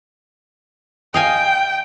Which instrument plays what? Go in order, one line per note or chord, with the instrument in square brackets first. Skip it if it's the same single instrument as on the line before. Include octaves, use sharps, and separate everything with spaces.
[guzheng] D#5 F5 G#5 [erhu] G5